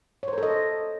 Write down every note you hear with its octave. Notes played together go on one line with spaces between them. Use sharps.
A4 A#4 C5 C#5 D#5